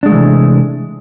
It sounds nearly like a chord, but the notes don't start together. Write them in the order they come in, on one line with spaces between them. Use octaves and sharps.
D4 G#3 A3 E3 C3